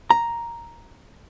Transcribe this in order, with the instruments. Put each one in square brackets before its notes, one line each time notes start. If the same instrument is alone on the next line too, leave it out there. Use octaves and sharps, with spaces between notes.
[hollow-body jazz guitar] A#5